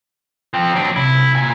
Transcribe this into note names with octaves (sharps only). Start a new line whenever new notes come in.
F3 C4
F#3 D4
C3 E3 E4
A#2 G#5